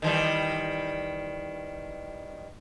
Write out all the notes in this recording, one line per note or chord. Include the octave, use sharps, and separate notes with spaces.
D#3 E3 G3